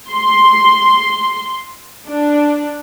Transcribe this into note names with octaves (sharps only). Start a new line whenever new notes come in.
C6
D4